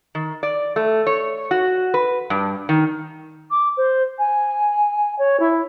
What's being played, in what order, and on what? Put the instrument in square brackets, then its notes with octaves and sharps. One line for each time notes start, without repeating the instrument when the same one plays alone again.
[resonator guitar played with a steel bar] D#3
D5
A3
C#5
F#4
B4
G2
D#3
[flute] D6
C5
G#5
C#5
E4